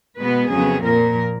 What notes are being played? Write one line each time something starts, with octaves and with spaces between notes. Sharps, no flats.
B2 G#3 B3 B4
F2 C#3 F#3 B3 G#4
A#2 F3 A#3 A#4